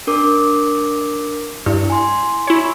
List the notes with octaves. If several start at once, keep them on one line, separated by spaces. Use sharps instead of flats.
D4 A#4 D6
G2 E4
G#5 C6
E4 C#5